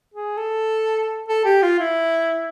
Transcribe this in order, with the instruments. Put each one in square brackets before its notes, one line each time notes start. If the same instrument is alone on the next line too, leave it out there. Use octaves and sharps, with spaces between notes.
[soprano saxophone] G#4
A4
A4
G4
F4
E4